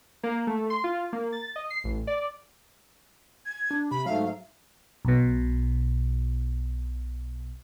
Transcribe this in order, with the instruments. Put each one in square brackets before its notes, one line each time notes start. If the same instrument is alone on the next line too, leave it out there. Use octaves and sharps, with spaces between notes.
[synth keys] A#3
A3
C6
F4
A#3
A6
D#5
C7
A1
D5
[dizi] G#6
[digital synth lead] D4
[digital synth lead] C3 [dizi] B5
[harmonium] G#2 A3 [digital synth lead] F#3 [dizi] F5
[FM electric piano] B1 B2